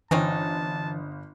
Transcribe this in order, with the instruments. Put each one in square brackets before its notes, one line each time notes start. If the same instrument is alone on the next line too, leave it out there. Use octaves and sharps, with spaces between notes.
[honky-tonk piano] G1 [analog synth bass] E3 [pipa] C4 C#4 D#4 [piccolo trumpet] A5